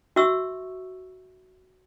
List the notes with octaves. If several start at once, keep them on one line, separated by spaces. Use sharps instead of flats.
F#4 E5 C#6 E6